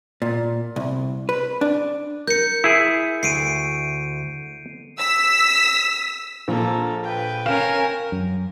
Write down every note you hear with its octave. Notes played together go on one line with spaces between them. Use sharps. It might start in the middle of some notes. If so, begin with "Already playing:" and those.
A#2
C2
B4
D4
A#4 G6 C#7
E4 G#4
D2 C7 D7 D#7
E6 B6
A#1 A#3 A4
B4 G5
C#4 A#4 F5 F6 E7
F#2